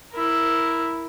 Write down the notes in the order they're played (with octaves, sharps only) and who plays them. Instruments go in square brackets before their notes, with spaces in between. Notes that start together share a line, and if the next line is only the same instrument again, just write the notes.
[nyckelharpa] E4 A#4